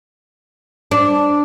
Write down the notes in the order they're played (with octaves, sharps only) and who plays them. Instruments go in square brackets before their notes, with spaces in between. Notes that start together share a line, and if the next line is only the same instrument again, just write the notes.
[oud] D4